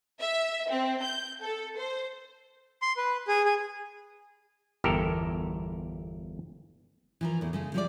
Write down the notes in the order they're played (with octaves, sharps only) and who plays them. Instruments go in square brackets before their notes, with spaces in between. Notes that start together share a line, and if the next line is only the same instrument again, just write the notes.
[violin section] E5
C4
G6
A4
C5
[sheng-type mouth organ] C6
B4
G#4
G#4
[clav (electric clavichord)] G1 E2 G4 A4 A#4
[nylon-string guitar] E3 F3 A#4
E2 A2
C#3 G#3 A3
F3 G3 G#3 E4 B4 D5